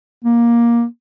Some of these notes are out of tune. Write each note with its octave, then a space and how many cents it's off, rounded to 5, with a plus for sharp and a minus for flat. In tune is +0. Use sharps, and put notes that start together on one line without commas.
A#3 +15